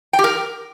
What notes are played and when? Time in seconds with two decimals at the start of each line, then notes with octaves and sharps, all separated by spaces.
0.13 G5
0.19 G4
0.24 A#4